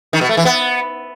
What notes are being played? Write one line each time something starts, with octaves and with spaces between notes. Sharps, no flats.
D#3
B2
A3
E3
B3